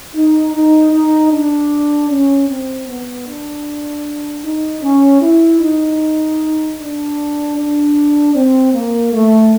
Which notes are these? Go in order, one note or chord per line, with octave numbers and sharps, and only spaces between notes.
D#4
D#4
D#4
D4
C#4
C4
B3
D4
D#4
C#4
E4
D#4
D4
D4
C4
A#3
A3